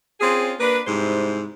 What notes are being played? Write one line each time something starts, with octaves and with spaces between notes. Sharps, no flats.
C4 C#4 F4 G#4
A#3 D4 B4
G#2 C3 G3 E4 C5